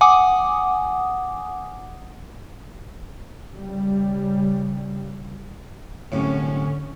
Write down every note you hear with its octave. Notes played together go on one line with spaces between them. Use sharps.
F#5 G#5 D6 D#6
C#3 G3
C2 F#2 A2 D3 C#4